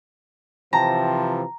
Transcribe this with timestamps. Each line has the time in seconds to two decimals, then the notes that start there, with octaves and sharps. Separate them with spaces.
0.73 C3 E3 F3 G5 A5 A#5